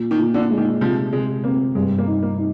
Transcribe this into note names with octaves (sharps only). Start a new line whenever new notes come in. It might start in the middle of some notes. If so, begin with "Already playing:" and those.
Already playing: A#2
D#3
A#2
D3
G#3
D#3
C3 F3
C3 G#3
A#3 C4
G2 G#3
A#3
D#4
A#3
D#4